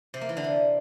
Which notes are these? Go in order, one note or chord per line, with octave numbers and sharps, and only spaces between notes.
C3
A#3
E3
D3
C3